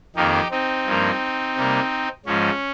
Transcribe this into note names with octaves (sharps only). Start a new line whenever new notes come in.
F2 D#3 A#3 D#4 G4
C4 D#4
G2 F3 A#3
C3 G3 A#3
G#2 F3 G#3 C#4